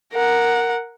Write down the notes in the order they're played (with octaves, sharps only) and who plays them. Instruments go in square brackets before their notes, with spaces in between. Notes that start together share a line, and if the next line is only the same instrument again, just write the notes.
[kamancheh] A#4 F#5